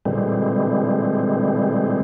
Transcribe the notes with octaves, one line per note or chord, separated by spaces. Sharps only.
A#2 D3 E3 G3 G#3 C4